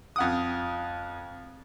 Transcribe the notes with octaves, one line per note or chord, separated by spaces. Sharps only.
F2 F#5 D#6